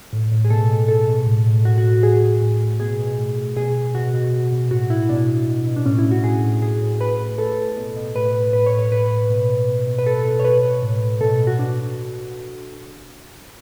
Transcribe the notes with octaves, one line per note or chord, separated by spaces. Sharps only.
A2
A2
G#4
B2 A4
B2
B2 A4
B2
A2
A2
A2 F#4
F#4
A2
F#4
A2 G#4
A2
A2
A2
B2 G#4
B2
A2
A2
B2 G#4
B2
B2 F#4
B2
B2
B2
A2 F#4
A2 E4
B2 D4
B2
B2
B2
D4
A2 C#4
E4
A2
F#4
A2 G#4
A2
A2 G#4
A2
A2 B4
A2
A2 A4
A2
B2
B2
A2 B4
A2
A2 B4
C#5
A2
C#5
A2 B4
A2
B2
B2
B2
B2
B4
B2 A4
B2
C#5
B2 B4
B2
A2
A2
B2 A4
B2
F#4
B2 D4